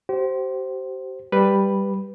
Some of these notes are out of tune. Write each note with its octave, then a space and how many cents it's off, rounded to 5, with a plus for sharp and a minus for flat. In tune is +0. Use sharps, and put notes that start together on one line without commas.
G4 -40 C5 +0
G3 +0 B4 +0